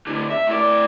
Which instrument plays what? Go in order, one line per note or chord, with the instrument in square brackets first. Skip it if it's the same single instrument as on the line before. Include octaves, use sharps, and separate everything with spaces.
[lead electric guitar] A2 D3
E5
A2 D5